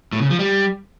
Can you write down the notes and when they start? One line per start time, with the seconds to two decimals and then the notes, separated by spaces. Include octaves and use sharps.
0.13 A2
0.21 C#3
0.30 F3
0.39 G3